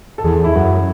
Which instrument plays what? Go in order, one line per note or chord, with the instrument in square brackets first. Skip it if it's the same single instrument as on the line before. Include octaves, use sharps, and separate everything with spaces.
[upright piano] A4
[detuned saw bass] E2 [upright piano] G#4
[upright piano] E4
[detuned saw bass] F#2 [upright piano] F#4